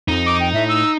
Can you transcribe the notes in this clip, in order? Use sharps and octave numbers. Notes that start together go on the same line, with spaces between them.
F2 D#4
D6
G5
A2 E5
E6